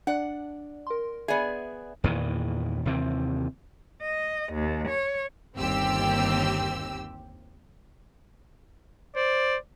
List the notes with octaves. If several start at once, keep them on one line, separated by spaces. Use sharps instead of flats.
D4 D5 F#5
A#4 C6
B3 G#4 D5 E5
E2 A#2 D#3 E3
D#2 C3 E3 C4
D#5
D#2
C#5
G1 D#2 C4 G4 E6
C5 D5